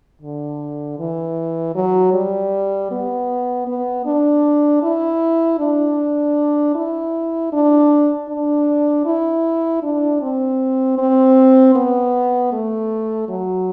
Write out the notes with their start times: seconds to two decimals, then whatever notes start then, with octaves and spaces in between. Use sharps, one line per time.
0.22 D3
0.99 E3
1.75 F#3
2.13 G3
2.91 B3
3.67 B3
4.05 D4
4.83 E4
5.59 D4
6.75 E4
7.52 D4
8.29 D4
9.06 E4
9.83 D4
10.22 C4
10.98 C4
11.75 B3
12.52 A3
13.28 F#3